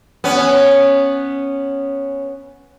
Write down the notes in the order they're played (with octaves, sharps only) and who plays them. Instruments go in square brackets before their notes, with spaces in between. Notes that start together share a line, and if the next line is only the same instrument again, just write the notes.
[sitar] B3 C#4